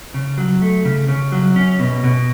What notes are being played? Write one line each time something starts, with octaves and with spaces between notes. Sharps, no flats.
C#3
F#3
A3
C#3
C#3
F#3
C#4
B2
B2